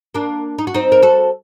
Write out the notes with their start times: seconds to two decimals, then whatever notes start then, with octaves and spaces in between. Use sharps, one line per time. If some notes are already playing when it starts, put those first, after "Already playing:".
0.14 A#3 D4
0.58 D#4
0.67 F#4
0.74 C4 D#4
0.92 A#4
1.02 F#4 A4